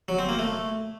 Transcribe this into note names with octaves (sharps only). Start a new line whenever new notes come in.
F#3
C4
A#3
A3